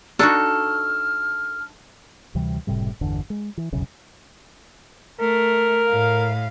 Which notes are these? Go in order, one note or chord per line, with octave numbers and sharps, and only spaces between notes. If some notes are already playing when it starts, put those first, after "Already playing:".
D4 D#4 F#4 A4 F6
D2 C3 E3 G3
F#1 A2 C3 G3
G1 E2 D3
G#3
E3
E1 B1 F#2 C#3
A3 A#4
A2 F5